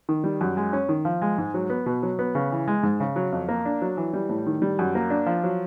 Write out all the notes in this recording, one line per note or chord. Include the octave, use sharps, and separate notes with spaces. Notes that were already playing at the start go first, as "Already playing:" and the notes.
D#3
G3
F#2
G#3
C#4
D#3
F3
G#3
G#2
F#3
B3
B2
F#3
B3
C#3
E3
G#3
G#2
C#3
F#3
F2
A#3
D4
F#3
E3
G3
A2
D#3
G3
F#2
A#3
D4
F3
F#3